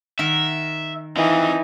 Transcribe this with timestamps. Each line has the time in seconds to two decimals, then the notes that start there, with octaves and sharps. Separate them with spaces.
0.19 D#3 A#4 E5 F#5
1.17 E3 F3 C4 D#4